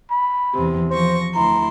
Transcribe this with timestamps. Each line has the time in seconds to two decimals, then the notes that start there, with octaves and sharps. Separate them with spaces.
0.11 B5
0.54 E2 C3
0.90 F3 C5 C#6 A#6
1.35 D2 E4 A#5 C6